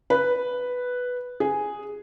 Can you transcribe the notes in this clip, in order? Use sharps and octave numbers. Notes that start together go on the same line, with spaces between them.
B4
G#4